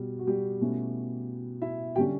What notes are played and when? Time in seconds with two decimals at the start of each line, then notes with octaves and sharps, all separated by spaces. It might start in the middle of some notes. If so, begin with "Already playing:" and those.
Already playing: B2 G3
0.19 F#4
0.27 G3 G4
0.61 B2 A3 C#4 E4
1.62 E4 E5
1.96 D3 G3 C#4 E4 G4 G5